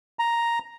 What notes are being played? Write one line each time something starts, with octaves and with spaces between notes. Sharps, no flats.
A#5